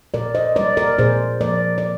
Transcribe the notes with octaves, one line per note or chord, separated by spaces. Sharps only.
A#2 A#4 D5
C5 D#5
G3 A#3 A#4 D5
A#4 D5
A#2 G#4 C5
F3 A#3 A#4 D5
D5